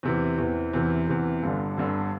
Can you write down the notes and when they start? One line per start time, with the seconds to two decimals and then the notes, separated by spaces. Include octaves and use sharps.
0.03 E2 C3 E3
0.38 E2 C3 E3
0.73 E2 C3 E3
1.07 E2 C3 E3
1.43 G1 G2 D3
1.77 G1 G2 D3